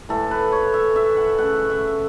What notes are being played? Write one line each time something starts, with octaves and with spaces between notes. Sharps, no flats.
A2 E3 A3 A4
B4
C#5
E5
E5
F#5
C#3 A3 F#5
E5